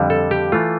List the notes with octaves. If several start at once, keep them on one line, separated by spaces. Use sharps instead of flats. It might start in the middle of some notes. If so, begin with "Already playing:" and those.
Already playing: F2 D3 G3
A4
G4
E3 A3 F4